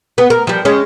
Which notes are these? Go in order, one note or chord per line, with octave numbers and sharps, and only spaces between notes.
B3
A#4
F3 G3
G#3 C#4